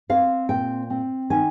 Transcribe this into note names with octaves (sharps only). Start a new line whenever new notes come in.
C4 F5
A#2 G5
C4
D#3 G#5